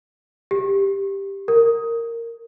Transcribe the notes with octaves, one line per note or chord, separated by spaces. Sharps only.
G4
A#4